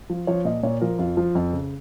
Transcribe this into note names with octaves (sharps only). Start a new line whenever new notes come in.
F3
F3 C#5
A#2 D#5
A#2 C#5
F3 A#4
F2 F4
F3
F2
C#3